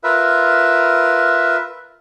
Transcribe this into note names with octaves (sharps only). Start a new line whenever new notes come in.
F4 A#4 B4 E5